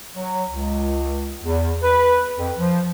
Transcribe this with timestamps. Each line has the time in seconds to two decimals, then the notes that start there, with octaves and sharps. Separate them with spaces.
0.14 F#3
0.48 C#2
1.42 E2
1.82 B4
2.37 F2
2.57 F3